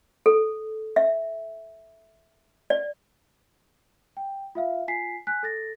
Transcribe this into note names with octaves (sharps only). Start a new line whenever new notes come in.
A4
E5
D5
G5
F4 E5 F5
F4 G#5 B6 C7
G#5 F#6 B6
A4 A6 A#6